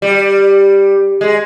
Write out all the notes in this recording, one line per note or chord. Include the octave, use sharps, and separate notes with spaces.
G3
G#3